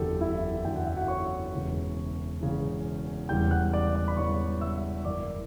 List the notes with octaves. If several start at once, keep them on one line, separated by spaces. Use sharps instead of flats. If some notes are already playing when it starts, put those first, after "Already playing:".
Already playing: F#1 E2 D3 F#3 G4 A4
E4 E5
F#1 E2 D3 F#3 G5
F#5
E5
F#4 F#5
C#5 C#6
E1 E2 C#3 E3
E1 E2 C#3 E3
E1 E2 C#3 E3 G3 G5 G6
F#5 F#6
D5 D6
D5 D6
B5
E1 E2 C#3 E3 G3 C#5 C#6
E5 E6
F#1 F#2 E3 D5 D6